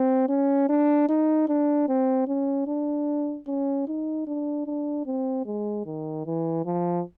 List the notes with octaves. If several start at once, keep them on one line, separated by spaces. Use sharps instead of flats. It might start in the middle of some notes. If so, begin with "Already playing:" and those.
Already playing: C4
C#4
D4
D#4
D4
C4
C#4
D4
C#4
D#4
D4
D4
C4
G#3
D#3
E3
F3